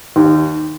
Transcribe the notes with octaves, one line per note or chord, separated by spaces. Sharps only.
D#2